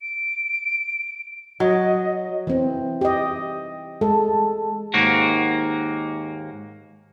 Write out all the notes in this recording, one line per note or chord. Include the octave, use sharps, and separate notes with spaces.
D7
F#3 D#5
E3 C4
G4 D#5
G#3 A4
D#2 G#2 A#3 F#4